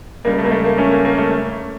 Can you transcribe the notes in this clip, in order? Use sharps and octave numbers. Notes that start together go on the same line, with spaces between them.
C#2 C#3 G3 A#3
A3
A#3
A3
A#3
A3 C#4
A#3
A#3
A3